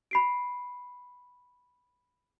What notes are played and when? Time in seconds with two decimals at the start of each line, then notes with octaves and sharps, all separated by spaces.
0.11 B5 C7 D7